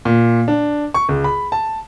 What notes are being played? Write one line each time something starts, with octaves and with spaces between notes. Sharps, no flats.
A#2
D4
C#6
C#2
B5
A5